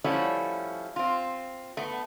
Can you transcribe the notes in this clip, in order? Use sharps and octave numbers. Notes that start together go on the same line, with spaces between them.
F3 G3 A3 C#4 E4 F#4
C4 F4
A3 B3